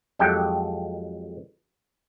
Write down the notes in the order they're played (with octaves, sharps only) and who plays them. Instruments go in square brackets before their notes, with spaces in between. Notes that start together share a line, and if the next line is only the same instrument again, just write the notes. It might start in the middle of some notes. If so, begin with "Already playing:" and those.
[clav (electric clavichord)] F2 F#3 G#3 G4 A4 G5